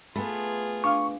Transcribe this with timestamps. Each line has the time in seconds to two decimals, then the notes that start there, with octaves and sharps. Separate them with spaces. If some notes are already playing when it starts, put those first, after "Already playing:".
0.16 A3 B3 F4 G#4 B5
0.84 D4 F5 C#6 F6